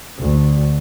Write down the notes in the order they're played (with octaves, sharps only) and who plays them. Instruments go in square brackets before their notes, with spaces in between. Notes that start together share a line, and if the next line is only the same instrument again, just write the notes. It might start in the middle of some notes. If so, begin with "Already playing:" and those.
[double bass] D2 D3